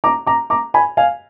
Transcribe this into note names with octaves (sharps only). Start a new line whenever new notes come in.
A#5 D6
A#5 D6
A#5 D6
G#5 B5
F5 G#5